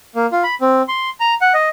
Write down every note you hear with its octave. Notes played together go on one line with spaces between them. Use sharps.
A#3
F4
B5
C4
C6
A#5
F#5
D#5